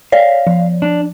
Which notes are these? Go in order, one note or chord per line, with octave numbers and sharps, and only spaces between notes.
C#5 D5 F5
F3
D4